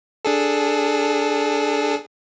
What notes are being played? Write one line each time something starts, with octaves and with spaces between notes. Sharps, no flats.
D4 G#4 A4